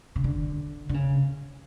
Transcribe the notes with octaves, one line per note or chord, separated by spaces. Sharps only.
C#3
D3
D3
C#3